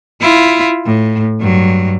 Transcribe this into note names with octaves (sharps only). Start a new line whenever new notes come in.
E4 F4
A2
G2 F#3